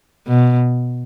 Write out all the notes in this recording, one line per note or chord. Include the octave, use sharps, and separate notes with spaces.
B2